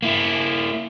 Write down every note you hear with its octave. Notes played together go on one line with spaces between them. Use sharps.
A#3 E4